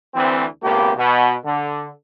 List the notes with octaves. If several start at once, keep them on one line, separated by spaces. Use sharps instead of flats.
D2 E3 C4
G#1 C#2 B2 A#3 G4
B2
D3